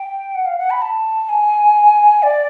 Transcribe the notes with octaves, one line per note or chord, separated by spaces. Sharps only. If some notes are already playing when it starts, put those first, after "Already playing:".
Already playing: G5
F#5
F5
F#5
B5
A5
G#5
D5